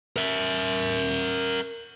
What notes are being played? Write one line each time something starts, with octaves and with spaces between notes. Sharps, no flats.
A#4 E5